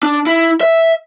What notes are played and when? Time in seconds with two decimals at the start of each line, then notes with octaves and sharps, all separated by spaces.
0.03 D4
0.27 E4
0.61 E5